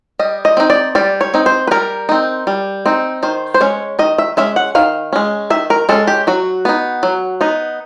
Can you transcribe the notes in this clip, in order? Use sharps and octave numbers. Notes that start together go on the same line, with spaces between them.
G3 D#5
D#5
C4 D#4
D5
G3 D5
C#5
C4 D#4
C5
B4
G3 A#4
C4 D#4
G3
C4 D#4
D#3 C5
C5
G#3 C#4 C#5
D#3 D#5
E5
G#3 C#4 E5
F#5
D#3 F5
G#3 C#4
D#3 E5
A#4
G#3 C#4 A4
G4
F#3 F#4
B3 D#4
F#3
B3 D#4